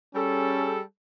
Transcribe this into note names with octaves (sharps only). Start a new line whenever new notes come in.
G3 C#4 G#4 A4